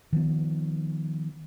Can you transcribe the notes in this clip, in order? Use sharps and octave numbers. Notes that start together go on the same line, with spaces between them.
D#3 F3 B3